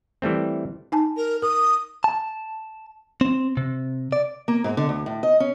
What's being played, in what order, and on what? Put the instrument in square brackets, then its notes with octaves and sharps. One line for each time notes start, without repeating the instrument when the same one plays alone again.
[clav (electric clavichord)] E3 G3 A3 C4
[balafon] D#4 G#5 A5
[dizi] A#4
[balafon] A#4 [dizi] D#6
[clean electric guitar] A5
C4
C3
D5
[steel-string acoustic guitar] A#3
G#2
D3
D2
A2
D#5
C#4